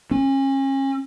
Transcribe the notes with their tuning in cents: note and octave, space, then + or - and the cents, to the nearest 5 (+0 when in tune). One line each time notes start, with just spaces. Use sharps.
C#4 -35